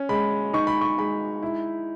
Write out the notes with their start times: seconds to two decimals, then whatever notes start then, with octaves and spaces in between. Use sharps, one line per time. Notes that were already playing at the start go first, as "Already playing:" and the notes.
Already playing: C#4
0.09 G#3 B5
0.53 D#4 C#6
0.67 B5
0.81 C#6
0.98 G#3 B5
1.43 E4